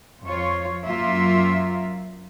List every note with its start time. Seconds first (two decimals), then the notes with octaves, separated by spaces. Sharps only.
0.23 F2 F4 C#5
0.85 F#2 A#3 F4 A#4 E5